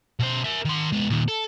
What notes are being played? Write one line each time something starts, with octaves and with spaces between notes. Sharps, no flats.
B2 C5
A#4 E5
D#3 C6
G#3 B3
A#2 D#3
A4